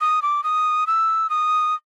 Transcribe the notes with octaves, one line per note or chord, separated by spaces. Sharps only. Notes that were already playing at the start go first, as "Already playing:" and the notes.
D#6
D6
D#6
E6
D#6